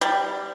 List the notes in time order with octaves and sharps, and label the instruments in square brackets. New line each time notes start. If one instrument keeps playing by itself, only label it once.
[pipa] G3